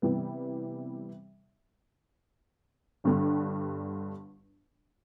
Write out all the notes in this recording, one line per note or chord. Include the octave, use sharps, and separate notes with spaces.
C3 E3 G3 B3
G1 G2 D3 G3 D4